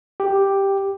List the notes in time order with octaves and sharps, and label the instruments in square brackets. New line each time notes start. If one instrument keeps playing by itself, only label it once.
[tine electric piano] G4